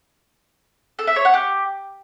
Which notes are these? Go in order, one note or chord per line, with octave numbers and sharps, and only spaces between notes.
A4
E5
C#5
F#5
G4